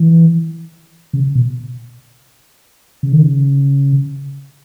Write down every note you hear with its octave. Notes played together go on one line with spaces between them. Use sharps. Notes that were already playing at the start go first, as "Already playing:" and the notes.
Already playing: E3
C#3
B2
C#3
D#3
C#3